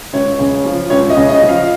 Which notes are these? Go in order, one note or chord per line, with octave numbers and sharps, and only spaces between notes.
C#2 C#5
C#3
F3
C#2 C#5
D#5
C#3
D#5
F3
F5